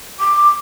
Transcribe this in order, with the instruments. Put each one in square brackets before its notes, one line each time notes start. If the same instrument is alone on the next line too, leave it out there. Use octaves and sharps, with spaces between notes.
[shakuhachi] D6